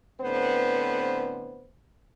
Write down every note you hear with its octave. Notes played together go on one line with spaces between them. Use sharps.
A2 D3 B3 C4 B4 C5